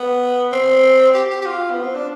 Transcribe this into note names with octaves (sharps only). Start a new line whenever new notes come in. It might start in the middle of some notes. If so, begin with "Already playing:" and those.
Already playing: B3
C4
G4
G4
G4
F4
B3
C4
D4